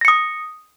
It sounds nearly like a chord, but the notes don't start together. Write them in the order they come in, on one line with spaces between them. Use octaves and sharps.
A#6 C#7 D#6